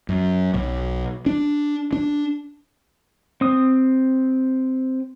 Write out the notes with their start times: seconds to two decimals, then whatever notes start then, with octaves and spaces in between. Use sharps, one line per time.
0.09 F#2
0.54 B1
1.26 D4
1.93 D4
3.41 C4 D#6